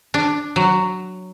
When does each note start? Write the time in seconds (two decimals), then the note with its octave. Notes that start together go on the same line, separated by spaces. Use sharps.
0.14 D4
0.56 F#3